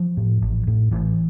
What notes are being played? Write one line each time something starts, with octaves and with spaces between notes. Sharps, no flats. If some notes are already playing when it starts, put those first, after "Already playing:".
Already playing: F3
A2
A1
A2
A1 E3